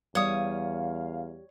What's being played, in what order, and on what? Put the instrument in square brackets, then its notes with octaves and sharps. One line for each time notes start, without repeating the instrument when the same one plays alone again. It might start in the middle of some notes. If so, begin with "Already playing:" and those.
[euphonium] E2 [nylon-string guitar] G3 [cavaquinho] C#5 D#6 [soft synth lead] F5